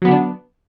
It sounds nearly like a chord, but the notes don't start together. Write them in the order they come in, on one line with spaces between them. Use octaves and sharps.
F#3 B3 D3 D4